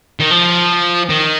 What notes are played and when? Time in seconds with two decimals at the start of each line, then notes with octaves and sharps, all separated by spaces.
0.20 D#3
0.31 F3
1.09 D#3